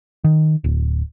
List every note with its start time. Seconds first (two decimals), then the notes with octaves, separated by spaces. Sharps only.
0.24 D#3
0.64 D1